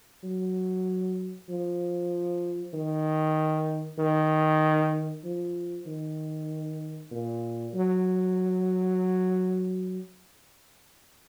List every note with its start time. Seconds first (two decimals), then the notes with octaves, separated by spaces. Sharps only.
0.24 F#3
1.50 F3
2.74 D#3
3.98 D#3
5.24 F3
5.86 D#3
7.11 A#2
7.74 F#3